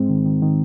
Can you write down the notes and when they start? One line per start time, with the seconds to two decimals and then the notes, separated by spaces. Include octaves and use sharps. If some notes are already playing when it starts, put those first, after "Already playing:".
Already playing: G#2 G#3 C4
0.09 D#3
0.26 D#3
0.42 D#3